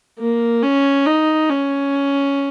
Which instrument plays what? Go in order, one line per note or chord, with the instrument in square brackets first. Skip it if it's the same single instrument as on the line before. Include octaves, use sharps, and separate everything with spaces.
[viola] A#3
C#4
D#4
C#4